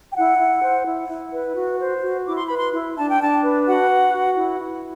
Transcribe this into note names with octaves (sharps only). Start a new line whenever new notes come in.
G5
E4 F#5
E4
C5
E4
E4
B4
F#4
C5
F#4
E4 D6
C6
B4 B5
C6
E4
D4 A5
G5
D4 A5
B4
F#4 F#5
B4
F#4
E4
E4